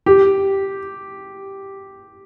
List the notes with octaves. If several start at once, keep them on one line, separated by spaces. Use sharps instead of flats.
G4